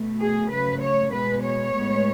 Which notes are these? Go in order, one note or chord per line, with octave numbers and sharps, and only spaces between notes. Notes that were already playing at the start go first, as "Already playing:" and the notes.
Already playing: B2 A3
G#4
C#3 F#3 A3 B4
C#5
B2 G#3 B3 B4
C#5
A2 G#3 B3